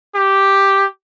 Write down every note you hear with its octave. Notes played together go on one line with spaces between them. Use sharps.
G4